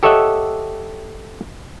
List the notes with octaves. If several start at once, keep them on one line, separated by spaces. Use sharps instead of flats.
G4 A4 C#5 D#5 E5 F#5